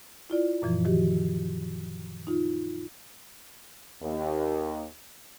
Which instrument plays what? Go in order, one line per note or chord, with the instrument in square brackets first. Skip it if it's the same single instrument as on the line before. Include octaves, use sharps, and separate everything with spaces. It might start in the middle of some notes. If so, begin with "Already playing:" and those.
[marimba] E4 F4 D5
F#2 A#2 E3 F3
D#3 F3 F#4 G4
D#4 F4
[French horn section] D#2